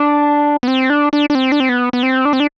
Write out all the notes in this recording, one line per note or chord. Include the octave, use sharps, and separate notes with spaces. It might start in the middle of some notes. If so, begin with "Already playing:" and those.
Already playing: D4
B3
C4
D4
D4
D4
C4
D4
C4
B3
B3
C4
D4
C4
D4